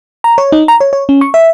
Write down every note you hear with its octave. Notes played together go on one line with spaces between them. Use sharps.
A#5
C#5
D#4
A#5
C#5
C#5
C#4
C#6
E5